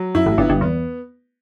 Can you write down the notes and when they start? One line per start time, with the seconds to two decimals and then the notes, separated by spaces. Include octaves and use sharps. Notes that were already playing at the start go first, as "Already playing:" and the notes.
Already playing: F#3
0.15 F#2 E4
0.26 A1 A2
0.38 G1 G2 B3
0.49 G1 G2
0.61 E2 B3